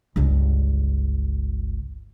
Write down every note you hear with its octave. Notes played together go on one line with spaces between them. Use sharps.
G1 C#2